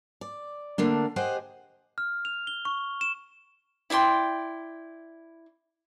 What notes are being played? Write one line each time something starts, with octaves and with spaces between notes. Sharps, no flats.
D5
D3 A3 A#3 D4
G4 G#4 C5 D#5 F#5
F6
F7
G7
C#6
E7
E4 D5 G5 C6